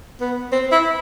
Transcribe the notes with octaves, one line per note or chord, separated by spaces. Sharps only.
B3
C4
E4